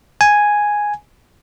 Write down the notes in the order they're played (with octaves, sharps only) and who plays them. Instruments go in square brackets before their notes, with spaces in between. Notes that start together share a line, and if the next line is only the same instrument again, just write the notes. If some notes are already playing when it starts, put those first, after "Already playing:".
[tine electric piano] G#5